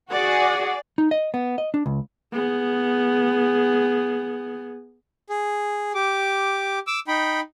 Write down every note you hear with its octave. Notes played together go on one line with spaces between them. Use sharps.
F#4 G#4 D5 F#5
D#4
D#5
B3
D#5
D4
C#2
B3 G#4
G#4
G4 D6
D6 E6
D#4 G5 B5